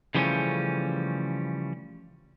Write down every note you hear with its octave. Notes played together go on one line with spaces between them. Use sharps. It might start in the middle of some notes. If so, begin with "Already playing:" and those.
C#3 E3 F3 G3 A3 C#4